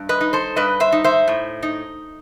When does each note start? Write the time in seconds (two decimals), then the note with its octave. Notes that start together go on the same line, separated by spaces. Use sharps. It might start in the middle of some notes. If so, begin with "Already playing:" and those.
Already playing: G2
0.09 B4 D#5
0.21 D#4
0.33 A4 C5
0.56 G2 B4 D#5
0.80 C5 E5
0.92 D#4
1.04 C5 E5
1.28 A2
1.63 D#4